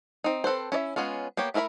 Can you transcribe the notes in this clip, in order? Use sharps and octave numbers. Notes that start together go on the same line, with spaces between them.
C4 D#4
C4 A4 B4 C5
C#4 E4 D5 E5
G#3 B3 C#4 F4
A#3 B3 G4 C#5
A3 E4 A#4 E5 B5